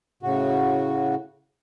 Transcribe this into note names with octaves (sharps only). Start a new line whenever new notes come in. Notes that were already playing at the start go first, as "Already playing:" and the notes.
A2 C#3 F#4